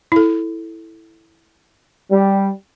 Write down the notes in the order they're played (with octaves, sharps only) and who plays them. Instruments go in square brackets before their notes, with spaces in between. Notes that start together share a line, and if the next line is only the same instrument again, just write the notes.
[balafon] E4 A4
[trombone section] G3